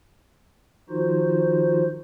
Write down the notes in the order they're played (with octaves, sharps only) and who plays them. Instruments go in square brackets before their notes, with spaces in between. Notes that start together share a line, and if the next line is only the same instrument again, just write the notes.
[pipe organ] D#3 F3 D#4 F4 F#4 C5